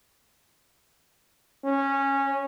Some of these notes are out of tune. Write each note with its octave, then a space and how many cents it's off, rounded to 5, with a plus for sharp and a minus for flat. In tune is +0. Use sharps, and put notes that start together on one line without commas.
C#4 -10